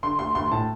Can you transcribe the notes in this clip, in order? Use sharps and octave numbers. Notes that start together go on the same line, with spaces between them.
D3 C6
D2 C6
D2 C6
A2 A5